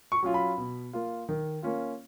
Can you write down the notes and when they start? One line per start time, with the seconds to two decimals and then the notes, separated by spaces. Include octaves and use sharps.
0.12 C#6
0.23 F#3 C#4 F4
0.34 B5
0.58 B2
0.93 A#3 F4
1.29 D#3
1.63 A#3 C#4 F4